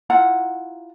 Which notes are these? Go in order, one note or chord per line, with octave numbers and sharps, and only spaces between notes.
E4 F4 F#5 A#5